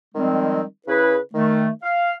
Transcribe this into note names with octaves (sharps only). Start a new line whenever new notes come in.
D#3 F3 G3 G#3 C4
C#3 E4 G#4 B4
D#3 A3
F5